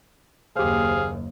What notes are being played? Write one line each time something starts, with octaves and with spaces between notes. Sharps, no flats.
F#1 D#2 G4 G#4 C5 F5